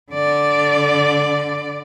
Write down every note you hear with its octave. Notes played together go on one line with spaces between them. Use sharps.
D3 D5